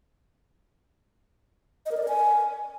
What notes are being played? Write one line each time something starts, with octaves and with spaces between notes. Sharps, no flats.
D#5
A#4
D5
A#4
G#5